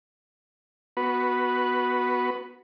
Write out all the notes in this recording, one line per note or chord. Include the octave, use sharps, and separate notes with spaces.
B3 F#4 B4